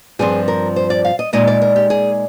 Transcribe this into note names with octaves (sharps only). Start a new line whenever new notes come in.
G2 F3 C4 G#4
A#4
C5
D5
F5
D#5
A#2 G#3 D#4 D#5
D5
A#4
G4
G#4